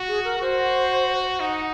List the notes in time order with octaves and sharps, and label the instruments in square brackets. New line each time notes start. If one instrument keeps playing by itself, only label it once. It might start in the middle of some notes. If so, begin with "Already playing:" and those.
Already playing: [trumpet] F#4
[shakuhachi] G#4
A#4
[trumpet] F#4 [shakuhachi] C5
[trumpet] D#4 [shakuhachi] F#5